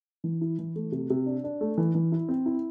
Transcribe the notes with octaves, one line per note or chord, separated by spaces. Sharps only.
E3
E4
E3
A3
C3
C3
D4
D4
A3
E3
E3
E4
C4
E4